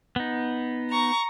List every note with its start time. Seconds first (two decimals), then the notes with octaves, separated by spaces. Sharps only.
0.16 B3 D#4
0.91 A#5 C#6